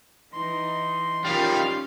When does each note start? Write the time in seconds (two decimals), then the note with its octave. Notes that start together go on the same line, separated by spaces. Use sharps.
0.33 E3 D#4 C6
1.25 D#3 G3 C#4 F4 G4 F5